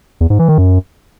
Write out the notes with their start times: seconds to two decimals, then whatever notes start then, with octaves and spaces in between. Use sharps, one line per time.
0.21 E2
0.30 G#2
0.39 E3
0.49 D#3
0.58 F#2